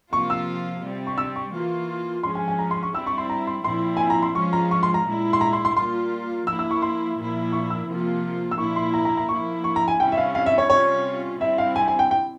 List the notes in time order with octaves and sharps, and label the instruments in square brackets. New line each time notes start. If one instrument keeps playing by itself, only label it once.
[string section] C3 F3 A#3 F4 [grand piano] C#6
[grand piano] E6
[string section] C3 G3 C4
[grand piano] C#6
E6
C#6
[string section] E3 A#3 F4
[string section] F3 G#3 C#4 [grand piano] C6
[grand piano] G#5
G#5
A#5
C6
C#6
[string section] G3 C4 E4 [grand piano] E6
[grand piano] C#6
C6
A#5
C6
[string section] A#2 F3 C4 E4 [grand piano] C6
[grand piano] G#5
A#5
C6
[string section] F3 G#3 C#4 F4 [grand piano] C#6
[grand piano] A#5
C#6
C6
A#5
[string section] A#2 G#3 E4
[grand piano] C6
A#5
C6
C6
[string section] G3 A#3 F4 [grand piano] C6
[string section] F3 A#3 E4 [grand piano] E6
[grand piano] E6
C#6
C6
[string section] A#2 F3 A#3 E4
[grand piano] C#6
E6
[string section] C3 F3 A#3 F4
[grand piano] E6
[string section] A#2 F3 A#3 E4 [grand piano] C#6
[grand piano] C6
A#5
A#5
A#5
[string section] F3 A#3 E4 [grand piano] C#6
[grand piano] C#6
A#5
G#5
[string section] C3 G3 C#4 E4 [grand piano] G5
[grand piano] E5
F5
F5
E5
C#5
[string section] C3 G3 C#4 F4 [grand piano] C#5
[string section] C3 G3 C4 E4 [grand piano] E5
[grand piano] F5
G#5
G#5
G5
G5